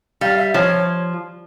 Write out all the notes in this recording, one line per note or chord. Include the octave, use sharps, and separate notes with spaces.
G3 F5
E5
F3 C#5